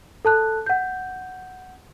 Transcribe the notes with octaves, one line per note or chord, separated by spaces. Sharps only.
A4 A5 F#6
F#5 G6